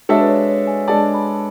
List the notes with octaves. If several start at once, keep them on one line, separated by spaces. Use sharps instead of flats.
G#3 D4 F#4 A4 C#5 E5
B4
C#5
C#5
G#5
G#3 D4 A4 D5 A5
B5